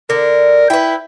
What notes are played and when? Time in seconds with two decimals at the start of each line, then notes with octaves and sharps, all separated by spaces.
0.10 D3 A#4
0.70 E4 B4 G5